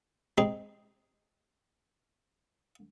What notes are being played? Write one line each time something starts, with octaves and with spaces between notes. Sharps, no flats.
G#3 C4 D#4 G#4